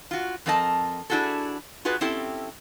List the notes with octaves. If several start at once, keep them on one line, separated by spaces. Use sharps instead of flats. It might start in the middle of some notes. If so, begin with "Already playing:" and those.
F4 F#4
F2 C4 A4 A#4 D#5 A5
D4 E4 F#4 G#4 A4
F4 F#4 G#4 B4 D#5
C4 C#4 E4 G4 A4